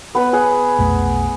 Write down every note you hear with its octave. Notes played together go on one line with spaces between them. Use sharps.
B3 B4 B5
G#4 F#5
B1 F2 A3